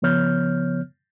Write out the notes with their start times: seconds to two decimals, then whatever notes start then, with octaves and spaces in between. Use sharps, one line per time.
0.02 C#3 F3 B3 C#5 F6 G6